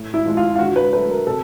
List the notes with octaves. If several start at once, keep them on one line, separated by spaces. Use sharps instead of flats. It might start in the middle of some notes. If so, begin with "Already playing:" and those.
Already playing: A2
E4
F3 G#3
F4
F4
D3 F#4
B4
F#3 A3 B4
A#4
C3 A4